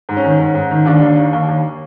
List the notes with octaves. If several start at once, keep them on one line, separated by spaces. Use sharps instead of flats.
G#2
C#4
D#3
G#2
G#2
D#3
D#2 D4
D#2
D#3
D#2
D#2